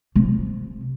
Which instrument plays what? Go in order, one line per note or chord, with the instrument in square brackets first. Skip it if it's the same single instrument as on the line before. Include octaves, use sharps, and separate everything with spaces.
[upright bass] C3